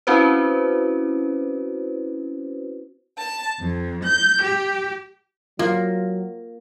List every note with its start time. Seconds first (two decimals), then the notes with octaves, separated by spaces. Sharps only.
0.07 C4 C#4 E4 F#4 B4 C5
3.18 A5
3.60 F2
4.03 G6
4.42 G4
5.59 F#3 A#3 F4